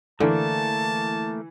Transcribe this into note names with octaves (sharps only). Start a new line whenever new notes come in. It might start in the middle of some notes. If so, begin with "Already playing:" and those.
D3 E3 A3 A#3 A5